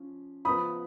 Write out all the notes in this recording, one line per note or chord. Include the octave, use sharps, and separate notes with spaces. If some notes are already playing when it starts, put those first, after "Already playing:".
Already playing: F3 C#4
F3 B3 B5 D#6